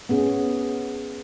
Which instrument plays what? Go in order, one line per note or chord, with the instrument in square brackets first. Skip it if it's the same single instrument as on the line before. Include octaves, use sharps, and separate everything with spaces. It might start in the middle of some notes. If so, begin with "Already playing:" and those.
[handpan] B3 C#4 G#4